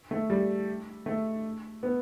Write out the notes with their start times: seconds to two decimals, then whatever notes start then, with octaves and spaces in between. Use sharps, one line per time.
0.11 A3
0.30 G3
1.06 A3
1.83 B3